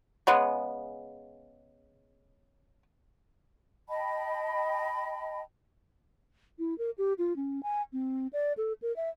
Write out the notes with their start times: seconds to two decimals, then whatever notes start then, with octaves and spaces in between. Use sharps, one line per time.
0.27 C#3 G#3 B3
3.88 D#5 G5 A5 B5
6.59 E4
6.78 A#4
6.98 G4
7.18 F4
7.36 C#4
7.63 G#5
7.93 C4
8.33 D5
8.57 A4
8.82 A#4
8.96 E5